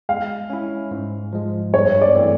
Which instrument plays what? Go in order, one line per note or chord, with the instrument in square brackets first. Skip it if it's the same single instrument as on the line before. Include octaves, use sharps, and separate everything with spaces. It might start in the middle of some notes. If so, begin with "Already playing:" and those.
[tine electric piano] G#3 [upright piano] F5
[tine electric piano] C#4 E4
G#2
F3 G#3
[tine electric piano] G2 [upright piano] C#5
[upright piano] D5
[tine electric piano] E3 A3 C4